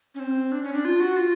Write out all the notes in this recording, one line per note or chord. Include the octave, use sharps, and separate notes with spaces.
C#4
C4
D4
C#4
D4
F4
F#4
F4